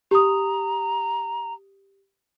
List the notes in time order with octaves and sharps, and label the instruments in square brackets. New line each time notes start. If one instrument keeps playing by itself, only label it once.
[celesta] G4 D#6 [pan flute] A#5